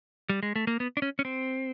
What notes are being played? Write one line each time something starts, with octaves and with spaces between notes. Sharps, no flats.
G3
G#3
A3
A#3
B3
D4
C#4
C#4
C4